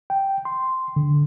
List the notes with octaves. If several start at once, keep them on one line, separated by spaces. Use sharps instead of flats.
G5
C6
D3